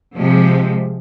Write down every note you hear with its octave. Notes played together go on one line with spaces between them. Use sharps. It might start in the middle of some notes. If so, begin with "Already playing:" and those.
C3 F3 G#3